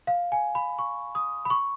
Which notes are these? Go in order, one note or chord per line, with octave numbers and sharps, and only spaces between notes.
F5
G#5
B5
C#6
D#6
B5
C#6